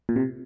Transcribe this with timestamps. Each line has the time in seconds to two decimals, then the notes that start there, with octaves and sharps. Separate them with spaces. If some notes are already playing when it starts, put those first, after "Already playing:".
0.09 A#2
0.16 C3